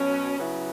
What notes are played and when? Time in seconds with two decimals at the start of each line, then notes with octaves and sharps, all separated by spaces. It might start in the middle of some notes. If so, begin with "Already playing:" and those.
Already playing: B2 F#3 C#4
0.38 C#3 F#3 B3 E4